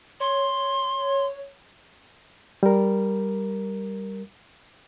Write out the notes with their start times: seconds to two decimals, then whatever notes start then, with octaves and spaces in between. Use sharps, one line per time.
0.20 C#5 C6
2.63 G3 A#4